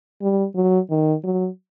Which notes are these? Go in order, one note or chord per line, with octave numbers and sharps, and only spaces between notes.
G3
F#3
D#3
F#3